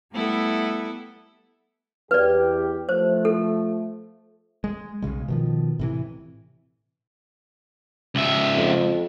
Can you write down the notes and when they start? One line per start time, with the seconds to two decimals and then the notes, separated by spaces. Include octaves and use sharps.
0.12 G3 A3 B3 E4 A4
2.11 E2 G4 B4 D5
2.89 F3 A3 C5
3.25 A4
4.64 G#3
5.02 B1 E2 C#3 G#3
5.28 B2 D#3 F3
5.79 A2 C3 E3
8.15 C#2 E5
8.56 F2